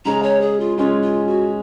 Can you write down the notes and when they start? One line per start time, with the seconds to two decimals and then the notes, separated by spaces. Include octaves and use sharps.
0.05 C#3 G#3 C#4 A#5
0.23 C#5
0.41 G#4
0.60 F4
0.78 C#3 G#3 C#4 F4
1.02 F4
1.27 F#4